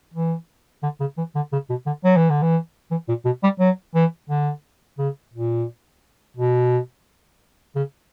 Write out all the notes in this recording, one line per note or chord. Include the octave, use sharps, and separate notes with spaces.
E3
D3
C#3
E3
D3
C#3
B2
D3
F#3
E3
D3
E3
E3
A#2
B2
G3
F#3
E3
D3
C#3
A#2
B2
C#3